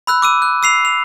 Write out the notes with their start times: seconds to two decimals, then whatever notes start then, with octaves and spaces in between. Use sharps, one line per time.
0.07 B5 E6 F#6
0.22 D6 E6 D#7
0.42 F#6
0.63 E6 C7 F7
0.85 F7